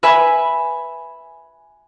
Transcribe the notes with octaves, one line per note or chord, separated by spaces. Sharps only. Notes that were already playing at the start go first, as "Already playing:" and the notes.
B4 E5 G#5 B5